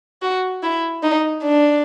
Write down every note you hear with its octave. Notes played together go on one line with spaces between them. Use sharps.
F#4
E4
D#4
D4